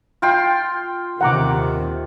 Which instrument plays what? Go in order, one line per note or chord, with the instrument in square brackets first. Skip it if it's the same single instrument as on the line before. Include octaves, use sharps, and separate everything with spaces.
[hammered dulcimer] F4 G5 C6
[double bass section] D#2 C3 D#3 [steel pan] F#5 A#5 D6